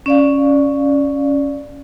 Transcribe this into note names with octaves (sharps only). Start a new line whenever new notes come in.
C#4 D5 F5